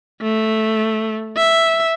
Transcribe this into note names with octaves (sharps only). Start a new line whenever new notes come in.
A3
E5